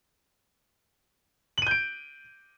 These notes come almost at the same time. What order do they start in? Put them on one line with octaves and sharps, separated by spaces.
F#7 D#7 G6 D7